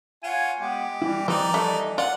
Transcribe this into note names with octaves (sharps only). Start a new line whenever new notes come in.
F4 C#5 F#5 G#5
G#3 B3 G4
E3 G3 E4
F3 C4 D#4 G4 B4 D5
A3 D#5
F4 D5 F#5